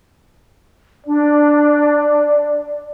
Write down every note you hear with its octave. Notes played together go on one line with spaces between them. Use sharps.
D4 D5